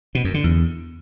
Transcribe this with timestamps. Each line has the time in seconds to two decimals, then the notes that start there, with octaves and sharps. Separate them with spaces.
0.15 B2
0.24 F#2
0.34 D3
0.44 E2